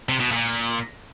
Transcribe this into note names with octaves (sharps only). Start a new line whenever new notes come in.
C3
B2
A#2